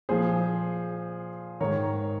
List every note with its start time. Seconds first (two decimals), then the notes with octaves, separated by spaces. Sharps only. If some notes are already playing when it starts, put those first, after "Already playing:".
0.09 A#2 F3 G#4 C5
1.61 G#2 D#3 A#4 C#5